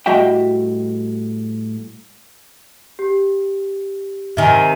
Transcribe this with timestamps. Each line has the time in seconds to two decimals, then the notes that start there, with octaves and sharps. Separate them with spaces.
0.06 A2 G3 F#4 D#5 E5 G5
2.99 G4
4.37 C3 D#3 E5 G#5